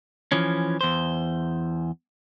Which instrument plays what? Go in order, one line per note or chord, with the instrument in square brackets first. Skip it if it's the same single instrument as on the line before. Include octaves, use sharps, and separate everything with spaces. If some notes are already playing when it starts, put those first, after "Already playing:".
[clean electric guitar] E3 F3 C#4
E2 C5